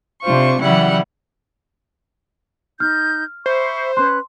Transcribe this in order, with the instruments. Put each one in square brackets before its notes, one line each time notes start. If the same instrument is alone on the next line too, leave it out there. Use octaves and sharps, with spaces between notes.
[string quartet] C3 D4 F4 C5 C#6
C#3 E3 F#3 G3 E4 F#5
[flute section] D#4 G6 [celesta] F6
[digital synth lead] C5 [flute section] E5 B5 C#6
[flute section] C#4 B4 F#6 [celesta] C6